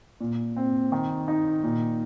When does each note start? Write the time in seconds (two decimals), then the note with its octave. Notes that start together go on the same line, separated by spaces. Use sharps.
0.20 A#2
0.56 C4
0.92 D#3
1.28 D#4
1.63 A#2